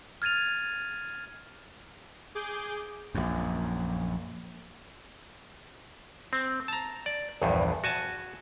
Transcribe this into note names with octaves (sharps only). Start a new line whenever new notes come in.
F6 G#6 A6 D#7 F7
G#4 D6 G6
A#1 F#2
C4
A5 A#5
D5
A#1 E2 G2
F#4 G#5 A5